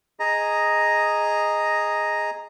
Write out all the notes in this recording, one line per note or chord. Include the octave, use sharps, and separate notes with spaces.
G#4 D#5 A#5